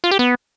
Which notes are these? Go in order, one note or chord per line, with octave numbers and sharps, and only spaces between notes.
F4
G4
B3